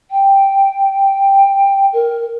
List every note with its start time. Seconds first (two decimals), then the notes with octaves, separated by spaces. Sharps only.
0.11 G5
1.93 A#4